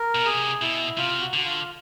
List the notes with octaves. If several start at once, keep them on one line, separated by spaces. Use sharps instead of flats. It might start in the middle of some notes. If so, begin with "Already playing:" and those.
Already playing: A#4
B2
C3 G#4
B2 E4
C3 F4
F#4
D3 F#4
F4